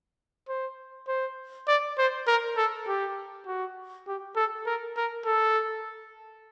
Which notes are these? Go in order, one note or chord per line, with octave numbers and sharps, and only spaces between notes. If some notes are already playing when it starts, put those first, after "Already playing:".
C5
C5
D5
C5
A#4
A4
G4
F#4
G4
A4
A#4
A#4
A4